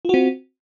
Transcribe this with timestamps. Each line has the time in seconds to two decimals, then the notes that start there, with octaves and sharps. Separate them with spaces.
0.05 F4
0.09 F#4
0.14 C4